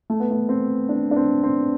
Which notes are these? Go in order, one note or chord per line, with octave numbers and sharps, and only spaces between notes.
A3
B3
A3
C4
D4
D4
C4
C4